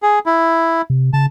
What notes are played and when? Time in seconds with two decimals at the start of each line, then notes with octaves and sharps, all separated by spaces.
0.02 G#4
0.26 E4
0.90 C3
1.13 C#3 A5